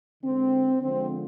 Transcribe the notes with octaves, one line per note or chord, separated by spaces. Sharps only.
D3 G#3 C4
D3 F3 G#3 C4